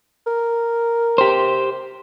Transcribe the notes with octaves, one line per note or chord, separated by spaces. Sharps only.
A#4
G4 C5